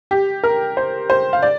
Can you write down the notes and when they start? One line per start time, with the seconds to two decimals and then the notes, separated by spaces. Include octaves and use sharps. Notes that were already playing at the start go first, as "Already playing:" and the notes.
0.11 G4
0.44 A#4
0.77 C5
1.10 C5
1.33 F5
1.42 D5